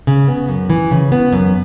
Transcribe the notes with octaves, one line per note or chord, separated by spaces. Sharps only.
C#3
B3
F#2
E3
C#3
B3
F#2